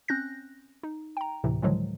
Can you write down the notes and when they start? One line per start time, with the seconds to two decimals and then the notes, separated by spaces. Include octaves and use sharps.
0.08 C4 C#4 F#6 G6 A#6
0.83 D#4
1.17 G5 A#5
1.44 D2 A2 C3 E3
1.62 A2 D3 D#3 F3 F#3 G#3